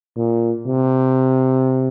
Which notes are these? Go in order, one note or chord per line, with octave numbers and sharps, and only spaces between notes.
A#2
C3